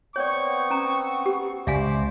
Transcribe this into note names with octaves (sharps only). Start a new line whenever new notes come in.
B3 C4 C#5 D5 C#6
C#4 A#5
G4
C#2 C5 D5 E5 F5 G#5